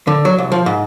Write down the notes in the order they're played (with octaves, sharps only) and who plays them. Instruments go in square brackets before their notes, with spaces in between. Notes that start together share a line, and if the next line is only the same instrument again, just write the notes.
[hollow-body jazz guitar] D3
F#3
C2
F3
G#2